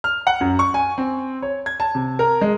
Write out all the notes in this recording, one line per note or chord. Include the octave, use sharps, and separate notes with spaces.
F6
F#5
F#2
C#6
G#5
C4
C#5
G#6
A5
C3
A#4
G#3